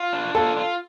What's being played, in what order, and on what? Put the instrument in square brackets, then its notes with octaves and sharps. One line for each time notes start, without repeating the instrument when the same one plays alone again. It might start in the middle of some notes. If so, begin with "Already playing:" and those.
Already playing: [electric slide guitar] F4
D4
[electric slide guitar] F4 [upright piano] A4
[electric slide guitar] F4